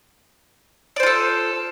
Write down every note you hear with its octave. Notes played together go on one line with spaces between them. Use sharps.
F4 A4 C5 D5